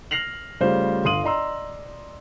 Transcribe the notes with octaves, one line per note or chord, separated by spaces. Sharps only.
F6 A#6 C7 F7 F#7
C#3 G3 A3 F4 C5
G1 F5 C6 D#6 D#7 F#7
D5 D#5 A#5 C6 E6